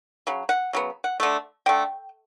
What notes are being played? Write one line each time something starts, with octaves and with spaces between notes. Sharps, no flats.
C#3 F#3
F#5
C#3 F#3 B3
F#5
D3 A3
D3 A3 G5